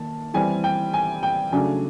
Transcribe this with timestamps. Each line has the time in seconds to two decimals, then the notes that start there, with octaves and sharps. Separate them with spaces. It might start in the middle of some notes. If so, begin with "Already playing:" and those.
Already playing: D#3 A#3 A5
0.34 E3 G3 C4 G#5
0.64 G5
0.94 G#5
1.23 G5
1.52 C#3 F#3 A3 D4 G#5